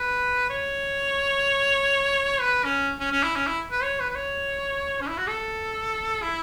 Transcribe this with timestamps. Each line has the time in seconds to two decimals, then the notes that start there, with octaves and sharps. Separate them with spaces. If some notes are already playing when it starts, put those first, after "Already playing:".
Already playing: B4
0.50 C#5
2.40 B4
2.64 C#4
3.00 C#4
3.12 C#4
3.23 E4
3.36 C#4
3.47 E4
3.71 B4
3.83 C#5
4.00 B4
4.10 B4
4.15 C#5
5.01 C#4
5.09 E4
5.17 F#4
5.27 A4
6.22 E4